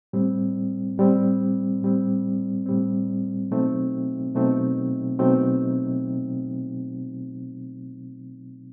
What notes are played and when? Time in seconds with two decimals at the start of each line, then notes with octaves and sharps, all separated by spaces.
0.13 A2 G3 C4
0.98 A2 G3 C4
1.82 A2 G3 C4
2.66 A2 G3 C4
3.51 B2 F#3 A3 C4 D#4
4.35 B2 F#3 A3 C4 D#4
5.19 B2 F#3 A3 C4 D#4